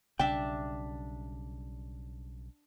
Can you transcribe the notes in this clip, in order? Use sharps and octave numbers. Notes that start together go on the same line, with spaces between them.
B1 C#3 G3 D4 E5 G5